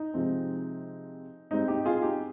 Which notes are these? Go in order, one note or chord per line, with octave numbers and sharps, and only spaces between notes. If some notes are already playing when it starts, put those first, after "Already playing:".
Already playing: D#4
C3 F3 G#3 C4
G#2 G3 C4 D#4
D#4 G4
F4 G#4
D#4 G4